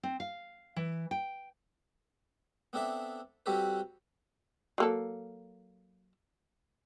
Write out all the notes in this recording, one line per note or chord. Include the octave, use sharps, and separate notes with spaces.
C4
F5
E3
G5
B3 C4 D4 A4 E5
G3 C4 F#4 G4 A4 B4
F#3 A#3 A4